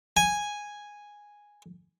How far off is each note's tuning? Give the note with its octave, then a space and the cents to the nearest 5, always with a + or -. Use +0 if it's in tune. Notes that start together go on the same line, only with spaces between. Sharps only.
G#5 -5